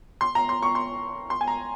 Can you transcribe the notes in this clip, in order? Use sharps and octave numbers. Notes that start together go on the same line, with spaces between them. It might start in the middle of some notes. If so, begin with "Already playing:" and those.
C6
A#5
C6
C#6
C6
C6
G#5
A#5